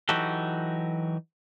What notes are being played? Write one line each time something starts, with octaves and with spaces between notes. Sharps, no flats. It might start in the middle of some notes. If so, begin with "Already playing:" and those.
E3 F#3 D#4 F#4 G4 A4